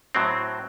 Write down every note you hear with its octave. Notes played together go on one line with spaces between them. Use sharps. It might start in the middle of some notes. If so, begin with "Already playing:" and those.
A2 F#3 C4